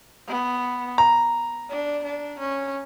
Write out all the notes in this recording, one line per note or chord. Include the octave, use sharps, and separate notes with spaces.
B3
A#5
D4
D4
C#4